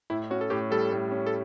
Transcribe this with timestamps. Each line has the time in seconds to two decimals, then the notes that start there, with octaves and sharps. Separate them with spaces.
0.10 A2 E4
0.30 C#4 F#4
0.41 A4
0.50 A2 G4
0.71 G3 A4
0.92 A2
1.11 C#4
1.27 A4